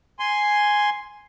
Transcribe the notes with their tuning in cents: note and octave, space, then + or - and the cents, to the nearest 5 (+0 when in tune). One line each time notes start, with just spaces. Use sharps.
G#5 +0 C6 +0